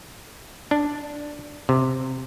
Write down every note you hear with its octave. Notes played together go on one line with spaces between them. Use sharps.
D4
C3